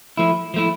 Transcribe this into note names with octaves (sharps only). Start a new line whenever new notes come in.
F3 A3 E4
F3 A3 E4